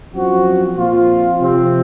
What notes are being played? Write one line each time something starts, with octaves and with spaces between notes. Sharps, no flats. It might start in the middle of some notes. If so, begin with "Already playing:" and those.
F#2 F3 C4 F#4
A#2 F3 C4 F4
C3 F3 C4